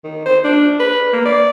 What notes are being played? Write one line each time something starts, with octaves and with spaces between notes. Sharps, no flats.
D#3
C5
D4
B4
A#3
D5